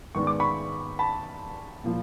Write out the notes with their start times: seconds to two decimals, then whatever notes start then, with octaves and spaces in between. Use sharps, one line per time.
0.15 G#2 D#3 G#3 B3 D4 C#6
0.27 D6
0.40 B5 C#6
0.99 A5 B5
1.84 A#2 F3 A#3